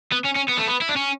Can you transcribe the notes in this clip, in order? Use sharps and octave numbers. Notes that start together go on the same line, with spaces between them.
B3
C#4
C#4
B3
A3
B3
E4
D4
C#4